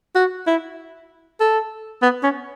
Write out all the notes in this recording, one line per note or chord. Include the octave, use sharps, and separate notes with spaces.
F#4
E4
A4
B3
C#4